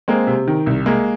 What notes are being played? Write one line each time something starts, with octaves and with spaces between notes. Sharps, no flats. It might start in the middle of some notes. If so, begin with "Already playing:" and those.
G#3 A#3 C4
C3
D#3
C2
G#3 A#3